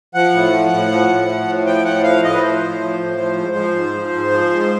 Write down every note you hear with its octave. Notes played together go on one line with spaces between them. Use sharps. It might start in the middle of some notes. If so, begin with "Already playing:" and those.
F3 F#5
A2
F3
A2
F3
A2
F3
A2
F3 G5
A2 F#5
F3 F5
A2 D#5
B4
F3 C5
A2
F3
A2
F3
G#2
F3
G#2
F3
G#2
F3
G#2